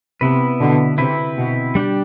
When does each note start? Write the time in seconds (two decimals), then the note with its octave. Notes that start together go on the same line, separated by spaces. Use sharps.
0.21 C3 B3 E4 B4
0.60 B2 D3
0.98 C3 C4 E4 B4
1.37 B2
1.75 G3 D4 G4